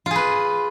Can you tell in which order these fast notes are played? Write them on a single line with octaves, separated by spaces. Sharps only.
F4 G#4 B4